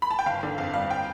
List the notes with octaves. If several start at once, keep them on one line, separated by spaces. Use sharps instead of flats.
B5
A5
G5
G1 F5
D3
F2 F5
G3 F5
G5